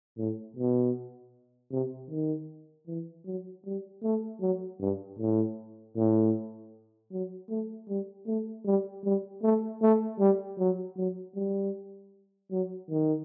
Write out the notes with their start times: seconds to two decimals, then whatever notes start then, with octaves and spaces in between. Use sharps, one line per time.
0.18 A2
0.56 B2
1.72 C3
2.11 D#3
2.87 E3
3.26 F#3
3.65 G3
4.03 A3
4.41 F#3
4.80 G2
5.19 A2
5.96 A2
7.12 F#3
7.50 A3
7.89 G3
8.27 A3
8.66 G3
9.04 G3
9.43 A3
9.82 A3
10.19 G3
10.59 F#3
10.97 F#3
11.35 G3
12.51 F#3
12.90 D#3